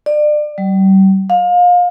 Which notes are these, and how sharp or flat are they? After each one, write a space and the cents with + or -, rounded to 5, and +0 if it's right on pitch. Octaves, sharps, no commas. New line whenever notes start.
D5 +30
G3 -35
F5 +30